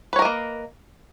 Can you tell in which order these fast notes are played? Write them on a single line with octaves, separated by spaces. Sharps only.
B4 C#5 A#4 D#5 A#3